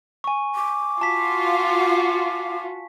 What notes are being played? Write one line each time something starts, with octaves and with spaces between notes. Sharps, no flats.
G#5 C#6
D6
F4 F#4 A5 B6